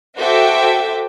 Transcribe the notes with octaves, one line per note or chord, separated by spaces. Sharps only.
F#4 A4 C5 E5 G5 D6